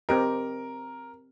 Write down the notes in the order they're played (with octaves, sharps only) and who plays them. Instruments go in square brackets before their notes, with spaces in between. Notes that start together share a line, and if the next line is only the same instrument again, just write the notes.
[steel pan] C4 G4 D#5 [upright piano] A#4